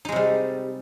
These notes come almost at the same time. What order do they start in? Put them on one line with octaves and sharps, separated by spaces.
D#4 G#3 C3 G3